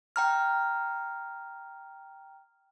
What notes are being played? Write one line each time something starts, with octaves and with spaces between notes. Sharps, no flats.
G5 A#5 F6